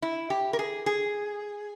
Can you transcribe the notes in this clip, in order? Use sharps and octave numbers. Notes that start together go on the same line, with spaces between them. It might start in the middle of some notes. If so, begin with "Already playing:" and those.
E4
G4
A#4
G#4
G#4